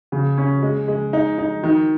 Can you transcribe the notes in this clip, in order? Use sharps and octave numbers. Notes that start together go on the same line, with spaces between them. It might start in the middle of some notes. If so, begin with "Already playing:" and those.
C#3
C#4
G#3
G#3
D#4
D#4
D#3